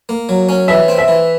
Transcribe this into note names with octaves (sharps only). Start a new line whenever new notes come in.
A#3
F#3
C#4
E3 E5
C4
E5
E3